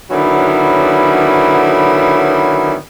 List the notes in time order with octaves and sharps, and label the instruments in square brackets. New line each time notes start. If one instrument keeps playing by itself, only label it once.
[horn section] D3 D#3 F#3 B3 C#4 E4